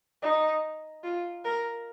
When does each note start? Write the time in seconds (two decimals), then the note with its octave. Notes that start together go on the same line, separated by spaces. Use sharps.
0.23 D#4
1.04 F4
1.45 A#4